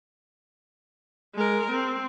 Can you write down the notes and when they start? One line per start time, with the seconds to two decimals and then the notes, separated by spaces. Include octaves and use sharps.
1.35 G#3 A#4
1.71 C4